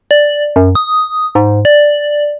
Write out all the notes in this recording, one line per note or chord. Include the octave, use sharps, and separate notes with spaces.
D5
F#2
D#6
G#2
D5